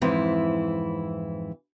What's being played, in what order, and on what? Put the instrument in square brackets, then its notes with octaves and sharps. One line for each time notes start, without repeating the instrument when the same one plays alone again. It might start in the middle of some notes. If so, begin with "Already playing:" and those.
[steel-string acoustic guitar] F2 G#2 E3 E4